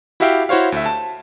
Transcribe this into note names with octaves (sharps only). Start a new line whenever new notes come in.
E4 F#4 G4 E5 F5 G5
E4 F#4 C5 C#5 F5
D2 E5
A5